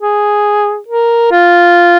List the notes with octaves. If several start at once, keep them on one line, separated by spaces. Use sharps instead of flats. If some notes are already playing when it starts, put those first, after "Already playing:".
G#4
A#4
F4